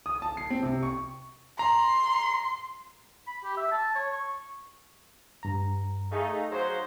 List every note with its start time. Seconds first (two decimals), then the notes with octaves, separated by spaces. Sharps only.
0.06 D#6
0.22 A5
0.37 C7
0.50 C4
0.63 C3
0.83 C#6
1.59 A#5 C6
3.27 B5
3.44 G4
3.57 E5
3.71 A5
3.95 C#5
4.12 C#6
5.43 G2 A#5
6.11 A3 D#4 G#4 F5
6.51 F#3 D#4 C5